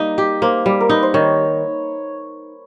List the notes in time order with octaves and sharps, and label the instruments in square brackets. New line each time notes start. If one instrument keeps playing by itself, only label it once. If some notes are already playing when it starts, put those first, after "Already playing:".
Already playing: [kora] G3 A#3 D#4
G4
[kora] A#3 [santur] C5
[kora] G3
[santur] A#4
[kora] D#4 [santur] B4
[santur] C5
[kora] D#3 [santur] C#5